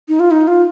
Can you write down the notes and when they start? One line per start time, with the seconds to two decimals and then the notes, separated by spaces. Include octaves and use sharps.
0.08 D#4
0.20 F4
0.31 D#4
0.48 F4